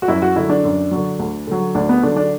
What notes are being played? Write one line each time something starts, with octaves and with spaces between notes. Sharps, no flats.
F#4
F#2 E4
F#4
D3 F#3 E4
D4
F#2
D3 F#3
D2
D3 F#3
D2 D4
B3
D3 F#3 D4
D4